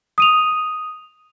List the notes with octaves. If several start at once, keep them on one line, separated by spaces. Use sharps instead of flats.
D#6 D#7 F7